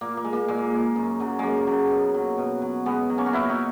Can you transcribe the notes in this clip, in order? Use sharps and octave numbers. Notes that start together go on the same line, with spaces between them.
A#2 A#3
A#3
G#3
A#3
A#2 G#3
G#3
F#2
C#3 F#3
F#2 G#3 A#3
C#3 F#3
B2
F#3
B2
F#3
B2 G#3 B3
F#3
A#3 C#4
F#4
B2 C#4 E4
D#4 F#4